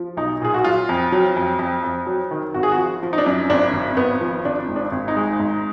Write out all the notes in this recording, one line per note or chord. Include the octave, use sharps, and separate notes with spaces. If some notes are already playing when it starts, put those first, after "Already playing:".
Already playing: F3
B1 D#4
A#2 G#4
F#4
F#3 F4
F2
F#3
F2
F2
F2
F#3
D#3
G#1 F#4
G#4
F#4
F3
F3
D#4
D4
F#2
G#1 D4
G#1
G#1 B3
F3
G#1 D4
G#2
D4
G#1
D#4
G#3
G#2